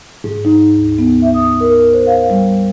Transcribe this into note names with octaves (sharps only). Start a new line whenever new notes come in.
G#2
D#4
D2
B3
E5
D#6
A#4
C5
F5
G3